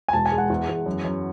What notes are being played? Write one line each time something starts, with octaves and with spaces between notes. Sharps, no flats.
G#5
E1 A5
G#5
G#3
F#5
E2
E2
F#2
F#2